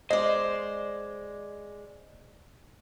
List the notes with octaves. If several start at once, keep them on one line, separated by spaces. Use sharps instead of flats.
G#3 C5 D5 D#5